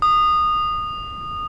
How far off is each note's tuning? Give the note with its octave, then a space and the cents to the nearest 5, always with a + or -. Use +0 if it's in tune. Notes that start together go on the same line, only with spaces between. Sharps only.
D#6 -20